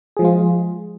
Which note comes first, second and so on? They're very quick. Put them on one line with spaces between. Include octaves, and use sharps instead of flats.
G#4 F3 G#3 F4